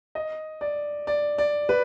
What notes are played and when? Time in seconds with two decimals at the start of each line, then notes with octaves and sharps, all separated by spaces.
0.15 D#5
0.61 D5
1.07 D5
1.38 D5
1.69 B4